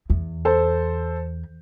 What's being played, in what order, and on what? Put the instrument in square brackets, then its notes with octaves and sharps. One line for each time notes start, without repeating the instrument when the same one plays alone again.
[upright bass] E2
[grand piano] A4 C5